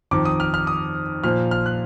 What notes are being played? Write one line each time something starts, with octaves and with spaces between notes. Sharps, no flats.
F2 D#3 D6
D#6
F6
F6
D#6
A#2 F3 F6
F6
F#6